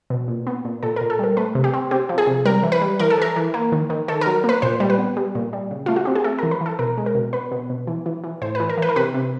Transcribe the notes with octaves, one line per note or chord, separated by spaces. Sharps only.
B2
A#2
B3
A#2
A#2 A4
A#4
A#2
A4
G3 A#4
A3 B4
C3
G4
C4
C4 G4
F3
G#4
C3
G3 A#4
E3
B4
G3
E3 A#4
A4
E3 A#4
E3
A#3
D#3
D#3
D#3 A4
A#4
F#3
A#3 B4
A#2 C5
G3
B4
B3
G3
A#2
G3
C#3
A3 F4
F#4
C4 G4
G#4
A3 A4
A#4
E3
B4
E3 A4
B2 A#4
G#3
A#4
B2
B3 B4
B2
B2
E3
E3
E3
A2 C5
B4
E3
A#4
E3 B4
A#4
C3 B4
C3